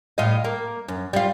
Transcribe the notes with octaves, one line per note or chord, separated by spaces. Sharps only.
A2 F4 D#5
A#3
F#2
G3 F4